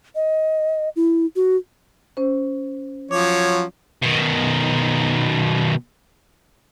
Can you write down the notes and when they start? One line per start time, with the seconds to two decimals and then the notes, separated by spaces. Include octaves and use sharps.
0.15 D#5
0.96 E4
1.36 F#4
2.17 C#4 C5
3.11 F3 F#3 C#5 D6
4.02 B2 D#3